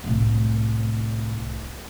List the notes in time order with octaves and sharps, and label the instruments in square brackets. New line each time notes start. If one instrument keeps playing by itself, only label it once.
[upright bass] C2 A2